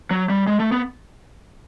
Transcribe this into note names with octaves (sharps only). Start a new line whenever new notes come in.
F#3
G3
G#3
A3
B3